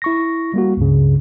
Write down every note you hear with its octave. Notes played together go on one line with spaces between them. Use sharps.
E4 C#6 A#6
G3 A#3 F#4
C#2 G2 C#3